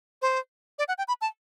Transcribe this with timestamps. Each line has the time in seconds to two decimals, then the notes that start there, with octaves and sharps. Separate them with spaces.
0.22 C5
0.79 D5
0.88 F#5
0.98 G5
1.08 B5
1.21 A5